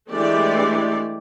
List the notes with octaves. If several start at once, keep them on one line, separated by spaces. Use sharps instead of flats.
E3 G#3 A3 D4 G4 D5